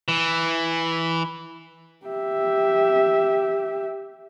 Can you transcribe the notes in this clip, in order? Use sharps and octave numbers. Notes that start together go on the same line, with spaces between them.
E3
G4 E5